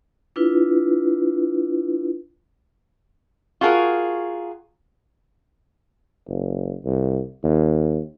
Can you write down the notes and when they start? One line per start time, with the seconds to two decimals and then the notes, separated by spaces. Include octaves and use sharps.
0.36 D4 E4 F4 B4
3.61 F4 F#4 G#4 A#4
6.28 F#1
6.85 C2
7.44 D#2